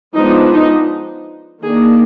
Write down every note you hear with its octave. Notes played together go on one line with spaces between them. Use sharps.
F3 G#3 B3 D4 D#4
D#4
D#3 A#3 D4 G#4